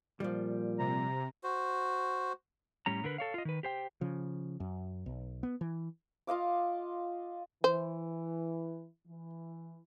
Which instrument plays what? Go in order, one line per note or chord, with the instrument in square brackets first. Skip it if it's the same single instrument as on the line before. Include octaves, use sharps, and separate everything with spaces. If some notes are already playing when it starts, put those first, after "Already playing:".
[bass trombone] A#2 [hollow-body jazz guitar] F3 G3
[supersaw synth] C3 [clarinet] A#5
[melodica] F#4 C5
[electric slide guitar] A2 G3 C#4 A#5
D3 A#4 B4
A4 C#5 F5
F4 D#5
D#3 B4
G4 C5 G5
[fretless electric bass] C#3 F3
F#2
B1
B3
E3
[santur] F4 D#5 F5 D6
[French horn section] E3 [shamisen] C5
[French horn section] E3